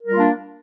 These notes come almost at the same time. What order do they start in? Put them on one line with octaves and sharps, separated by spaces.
A#4 G3 F4 A#3 D4